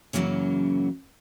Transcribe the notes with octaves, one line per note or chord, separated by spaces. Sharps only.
F#2 C#3 E3 F#3 A#3 C#4